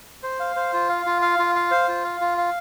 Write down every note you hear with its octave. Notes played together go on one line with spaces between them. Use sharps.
C5
F5
C5
F4
F5
F4
F5
F4
F5
C5
F4
F5
F4
F5